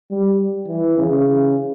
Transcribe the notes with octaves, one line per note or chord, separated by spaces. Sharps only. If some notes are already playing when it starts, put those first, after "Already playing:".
G3
E3
C#3